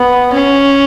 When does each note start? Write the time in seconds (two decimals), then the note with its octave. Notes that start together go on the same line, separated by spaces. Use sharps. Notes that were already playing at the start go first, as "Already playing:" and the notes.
Already playing: B3
0.33 C#4